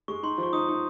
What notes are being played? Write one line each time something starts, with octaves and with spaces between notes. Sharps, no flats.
G#3 C#6
D#4 C6
F3
C#6
D#4 D#6
D#4